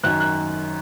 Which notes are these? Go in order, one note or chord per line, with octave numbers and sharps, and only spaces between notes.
F#2 D#3 F#3 F#6
F#6